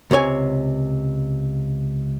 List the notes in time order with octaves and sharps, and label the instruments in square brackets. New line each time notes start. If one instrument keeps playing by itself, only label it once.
[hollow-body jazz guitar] C#2 C3 C#5 G#5